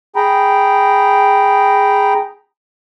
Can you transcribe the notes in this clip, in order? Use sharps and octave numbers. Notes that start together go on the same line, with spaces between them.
G#4 G5 A#5 B5